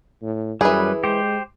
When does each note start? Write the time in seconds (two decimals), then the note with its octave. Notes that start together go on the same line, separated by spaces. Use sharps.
0.22 A2
0.61 F#2 E3 G3 G#4 B4
1.04 G#3 G4 C5